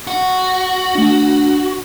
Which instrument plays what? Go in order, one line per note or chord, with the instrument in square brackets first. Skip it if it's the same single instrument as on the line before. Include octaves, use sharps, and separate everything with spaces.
[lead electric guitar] F#4
[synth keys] A3 D4